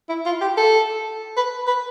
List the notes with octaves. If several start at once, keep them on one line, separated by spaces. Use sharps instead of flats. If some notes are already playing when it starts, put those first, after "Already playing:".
E4
F4
G4
A4
B4
B4